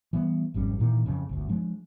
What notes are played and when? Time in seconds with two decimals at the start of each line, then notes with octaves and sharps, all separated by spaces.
0.13 E3 G3 B3
0.54 G#1 F2 G3 C#4
0.79 A#2 D#3 E3
1.06 F2 C#3
1.29 G1 D2
1.49 F3 G#3 D4